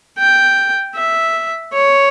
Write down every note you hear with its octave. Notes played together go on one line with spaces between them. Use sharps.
G5
E5
C#5